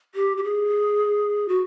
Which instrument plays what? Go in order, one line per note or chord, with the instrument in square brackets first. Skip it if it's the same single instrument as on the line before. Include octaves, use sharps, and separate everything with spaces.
[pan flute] G4
G4
G#4
F#4